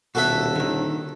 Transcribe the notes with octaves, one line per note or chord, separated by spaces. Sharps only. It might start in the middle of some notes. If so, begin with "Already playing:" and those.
D#1 B2 F#4 A4 E5
D3 D#3